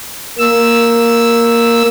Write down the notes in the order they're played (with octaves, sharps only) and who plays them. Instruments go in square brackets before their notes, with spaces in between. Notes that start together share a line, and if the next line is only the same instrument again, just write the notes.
[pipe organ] A#3 E6